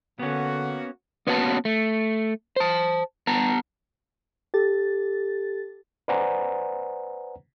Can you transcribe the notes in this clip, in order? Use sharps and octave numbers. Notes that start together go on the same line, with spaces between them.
D3 A#3 B3 C#4 F#4
A#3 B3 C#4 F#4 B4 A5
A3
C5 A5
B3 A5 A#5
G4 A4 A6
B4 C5 D5 F#5 G#5 A#5